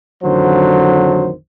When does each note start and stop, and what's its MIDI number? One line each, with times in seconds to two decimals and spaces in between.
0.23 1.31 33
0.23 1.31 41
0.23 1.31 50
0.23 1.31 51
0.23 1.31 54
0.23 1.31 72